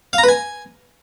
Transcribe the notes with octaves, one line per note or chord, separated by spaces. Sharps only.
F5
A#5
B4
G#5